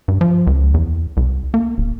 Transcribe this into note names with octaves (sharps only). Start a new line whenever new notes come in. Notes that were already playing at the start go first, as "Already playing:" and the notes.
G2
F3
C#2
E2
C2
A#3
D#1